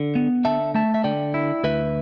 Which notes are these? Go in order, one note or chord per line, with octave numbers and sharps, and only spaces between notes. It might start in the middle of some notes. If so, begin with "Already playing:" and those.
Already playing: D3
B3
D3 E5 A5
A3 E5 A5
E5
D3 D5 G5
E4
D2 B4 E5